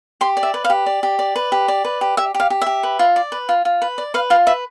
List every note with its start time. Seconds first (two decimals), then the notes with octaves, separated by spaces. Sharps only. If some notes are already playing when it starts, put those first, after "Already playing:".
0.21 G4 C6
0.37 D5
0.43 E5
0.54 B4
0.64 F5
0.70 G4
0.86 D5
1.03 G4
1.19 D5
1.36 B4
1.52 G4
1.68 D5
1.85 B4
2.01 G4
2.17 G4 E5
2.34 G4
2.40 F5
2.50 G4
2.61 G4 E5
2.83 B4
2.99 F4
3.16 D5
3.32 B4
3.49 F4
3.65 F4
3.82 B4
3.98 D5
4.14 B4 F5
4.30 F4 F5
4.46 B4 E5